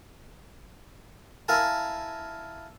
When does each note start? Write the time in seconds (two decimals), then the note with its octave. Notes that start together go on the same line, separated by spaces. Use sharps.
1.48 E4 A#4 F5 G#5 A5